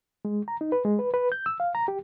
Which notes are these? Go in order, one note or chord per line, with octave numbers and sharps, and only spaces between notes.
G#3
A#5
D#4
B4
G#3
B4
B4
G6
E6
F5
A#5
G4